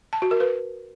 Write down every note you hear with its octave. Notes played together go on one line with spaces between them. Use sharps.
A5
F#4
A#4
B4